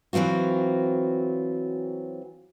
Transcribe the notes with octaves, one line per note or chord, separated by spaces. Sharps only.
E3 F#3 C4 F4 F#4